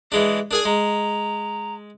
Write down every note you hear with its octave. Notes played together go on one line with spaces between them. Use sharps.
E3 G#3 D4 G#4
D4 G#4 A#4 G#5
G#3 A#5